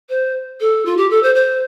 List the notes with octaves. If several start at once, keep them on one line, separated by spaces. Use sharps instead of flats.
C5
A4
F4
G4
A4
C5
C5